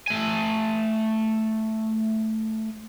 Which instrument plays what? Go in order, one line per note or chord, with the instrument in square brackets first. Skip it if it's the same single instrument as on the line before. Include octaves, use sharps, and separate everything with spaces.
[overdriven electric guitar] A3 G#5